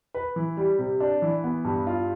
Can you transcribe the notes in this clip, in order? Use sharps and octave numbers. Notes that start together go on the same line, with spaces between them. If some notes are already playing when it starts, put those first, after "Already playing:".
B4
E3
G3
C3
D4
E3
B3
G2
F4